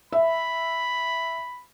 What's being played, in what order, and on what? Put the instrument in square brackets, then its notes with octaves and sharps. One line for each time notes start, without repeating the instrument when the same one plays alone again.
[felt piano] E5 [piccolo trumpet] B5